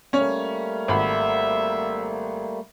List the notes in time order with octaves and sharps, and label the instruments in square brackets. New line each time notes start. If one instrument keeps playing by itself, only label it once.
[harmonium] G3 A3 A#3 [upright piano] C#4 C#5
[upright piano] G#1 B5 [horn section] E5